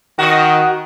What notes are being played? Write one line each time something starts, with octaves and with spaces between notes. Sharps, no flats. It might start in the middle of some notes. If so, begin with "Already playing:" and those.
D#3 F#4 D#5